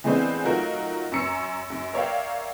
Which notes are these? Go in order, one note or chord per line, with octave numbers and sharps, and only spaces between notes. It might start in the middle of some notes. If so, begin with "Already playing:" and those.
E3 G#3 A3 B3 C4 D4
F#3 A3 D#4 F4 F#4 A#4
F#2 C#4 A#5 C#6 E6 C#7
F#2
A#4 C#5 D5 E5 F5 G5